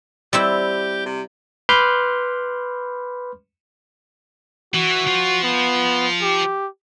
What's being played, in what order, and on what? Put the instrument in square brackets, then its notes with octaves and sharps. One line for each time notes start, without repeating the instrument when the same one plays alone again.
[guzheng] G3 C4 E4 [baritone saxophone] G4
[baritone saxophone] C3
[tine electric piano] B4 B5 C6 D6 F6 G6
[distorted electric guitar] E3 [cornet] F#4
[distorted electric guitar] F3 F4
[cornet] B3
G4